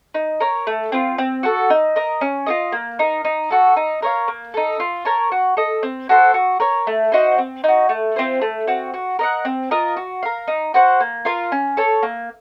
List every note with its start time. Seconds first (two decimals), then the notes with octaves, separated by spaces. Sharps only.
0.14 D#4
0.40 A#4 C#5
0.67 A3
0.92 C4 F4
1.18 C4
1.43 F#4 A4
1.70 D#4
1.96 A#4 D#5
2.21 C#4
2.47 F4 A4 D#5
2.72 A#3
2.99 D#4 A#4
3.25 D#4
3.50 F#4 A4
3.76 D#4
4.02 A#4 C#5 F5
4.28 A#3
4.54 D#4 A4
4.80 F4
5.05 A#4 C#5 A5
5.32 F#4
5.57 A4 D#5
5.83 C4
6.09 F#4 A4 C5
6.34 F#4
6.60 A#4 C#5
6.87 A3
7.12 D#4 F#4 C5
7.38 C4
7.64 D#4 F#4
7.89 A3
8.16 C4 F4 C5
8.41 A3
8.68 C4 F#4
8.94 F#4
9.19 A#4 D#5 F#5
9.45 C4
9.71 F4 A#4 D#5
9.97 F#4
10.23 A#4 F5
10.48 D#4
10.74 F#4 C5 F#5
11.00 A#3
11.25 F4 A#4 F5
11.52 C#4
11.77 A4 C#5
12.03 A#3